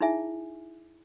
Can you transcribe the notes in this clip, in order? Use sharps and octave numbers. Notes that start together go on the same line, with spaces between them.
D#4 E4 G#4 E5 G#5